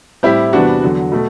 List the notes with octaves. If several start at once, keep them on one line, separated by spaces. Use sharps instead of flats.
A2 G3 C4 E4 G4
E2 C3 G3 B3 D4 F#4
E2 D3 F#3
B2 A3